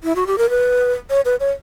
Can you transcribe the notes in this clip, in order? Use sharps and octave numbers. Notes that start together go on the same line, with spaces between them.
E4
F#4
G4
A#4
B4
C#5
B4
C#5